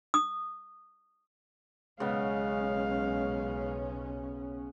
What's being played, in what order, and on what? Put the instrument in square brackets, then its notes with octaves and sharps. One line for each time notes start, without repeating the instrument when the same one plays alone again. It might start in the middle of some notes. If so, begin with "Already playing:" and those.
[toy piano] D#6
[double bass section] B1 C#4 [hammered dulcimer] C#3 B3 [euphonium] G#3 [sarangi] F5